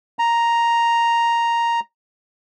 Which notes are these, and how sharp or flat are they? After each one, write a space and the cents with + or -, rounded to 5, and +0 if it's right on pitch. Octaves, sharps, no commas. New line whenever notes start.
A#5 +0